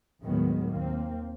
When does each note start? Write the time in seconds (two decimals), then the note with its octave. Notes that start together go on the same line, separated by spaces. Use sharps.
0.24 D#2 A2 D#3 F#3 G#3 B3
0.69 D#2 A#3 C4